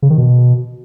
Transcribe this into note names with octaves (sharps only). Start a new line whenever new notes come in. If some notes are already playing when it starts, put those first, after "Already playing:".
C#3
D#3
B2